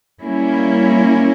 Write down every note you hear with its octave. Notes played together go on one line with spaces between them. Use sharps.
G3 A#3 C#4 E4